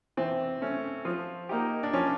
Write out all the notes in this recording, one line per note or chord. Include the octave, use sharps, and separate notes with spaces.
E3 C4
A3 C#4
F3
A#3 D#4 G4
D4
F3 C#4